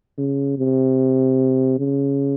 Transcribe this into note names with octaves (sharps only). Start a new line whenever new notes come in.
C#3
C3
C#3